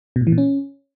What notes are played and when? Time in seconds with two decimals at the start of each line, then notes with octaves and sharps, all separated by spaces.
0.16 B2
0.21 A2
0.27 E3
0.32 A#2
0.38 C#4